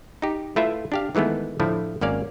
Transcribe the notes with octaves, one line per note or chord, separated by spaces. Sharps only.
D#4 G4
A3 E4 F4 B4 E5
D4 G4 F5
D#3 E3 G#3 A3 B3
A2 D3 F3 A3 E4
G#1 A#3 C#4 D5 F5